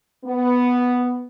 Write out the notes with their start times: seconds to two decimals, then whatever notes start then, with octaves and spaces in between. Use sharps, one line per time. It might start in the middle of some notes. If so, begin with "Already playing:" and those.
0.25 B3